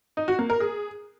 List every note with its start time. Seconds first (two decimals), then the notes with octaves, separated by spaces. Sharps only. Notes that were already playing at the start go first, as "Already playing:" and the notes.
0.17 D#4
0.28 F#4
0.39 A#3
0.50 A#4
0.60 G#4